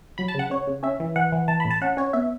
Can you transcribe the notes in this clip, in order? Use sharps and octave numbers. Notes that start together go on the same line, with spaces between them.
F#3 B5
A5
C#3 F#5
C#3 C#5
C#3
C#4 E5
E3
E3 F#5
E3
E3 A5
B5
A2
A5
C#4 F#5
C#4 C#5
B3 E5